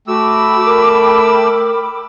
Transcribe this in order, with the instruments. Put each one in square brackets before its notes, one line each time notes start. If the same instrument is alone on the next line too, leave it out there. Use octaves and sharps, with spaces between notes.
[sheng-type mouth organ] A3 E6 [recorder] F#4 [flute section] G5 B5 D6
[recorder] A#4